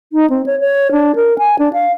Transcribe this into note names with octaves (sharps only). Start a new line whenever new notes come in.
D#4
C4
C#5
C#5
D4
A#4
G#5
D4
F5